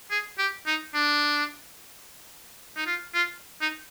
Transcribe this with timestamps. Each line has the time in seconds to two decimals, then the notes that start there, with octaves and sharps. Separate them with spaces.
0.11 G#4
0.38 G4
0.66 D#4
0.94 D4
2.76 D#4
2.86 F4
3.14 F4
3.61 D#4